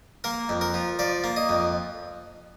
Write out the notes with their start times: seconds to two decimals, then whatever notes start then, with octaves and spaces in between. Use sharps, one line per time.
0.24 A#3 A#4
0.49 F2
0.61 A#4
0.74 F3
0.99 F3 D5
1.24 A#3
1.36 D#5
1.49 F2